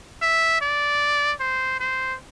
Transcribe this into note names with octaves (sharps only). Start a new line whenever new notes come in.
E5
D5
C5
C5